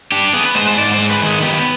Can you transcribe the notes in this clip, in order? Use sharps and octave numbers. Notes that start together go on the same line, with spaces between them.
D4 G4
B3 G#4
B4
G#3 C5
C5
G#2 D5
G#3 C5
B4
D#3
G#4
B3 G4